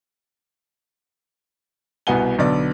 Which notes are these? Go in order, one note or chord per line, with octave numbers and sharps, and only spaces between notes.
C2 B2 B3 F#5 G#5 G7
B1 D3 B3 D5